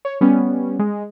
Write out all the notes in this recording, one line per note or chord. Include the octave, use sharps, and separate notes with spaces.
C#5
G3 B3 C#4
G#3